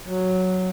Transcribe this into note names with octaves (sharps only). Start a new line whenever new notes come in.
F#3